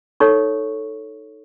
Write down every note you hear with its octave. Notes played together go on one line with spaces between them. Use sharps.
D#4 A4 C#5 C#6